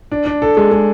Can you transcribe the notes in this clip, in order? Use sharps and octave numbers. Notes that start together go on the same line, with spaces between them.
D4
D4
A4
G#3
G#3